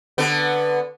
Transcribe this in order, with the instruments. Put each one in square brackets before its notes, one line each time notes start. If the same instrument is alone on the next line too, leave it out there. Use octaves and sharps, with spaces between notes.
[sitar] D3 B3